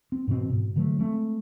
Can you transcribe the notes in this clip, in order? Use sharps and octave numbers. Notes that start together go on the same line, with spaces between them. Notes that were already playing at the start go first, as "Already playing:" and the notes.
C4
G#2 B2 E3 C4
G#2 B2
D3 E3 F#3 A3
G#3 A3 C4